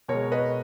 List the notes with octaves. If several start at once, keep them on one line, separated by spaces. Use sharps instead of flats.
B2 G#3 A#4 C#5
B4 D#5